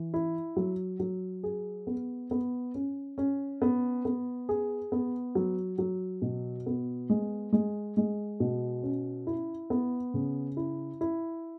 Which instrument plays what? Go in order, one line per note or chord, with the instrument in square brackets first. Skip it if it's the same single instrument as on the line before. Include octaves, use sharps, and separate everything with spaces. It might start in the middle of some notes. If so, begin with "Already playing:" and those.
Already playing: [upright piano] E3
E4
F#3
F#3
G#4
B3
B3
C#4
C#4
B3
B3
G#4
B3
F#3
F#3
B2
B3
G#3
G#3
G#3
B2
C#4
E4
B3
C#3
E4
E4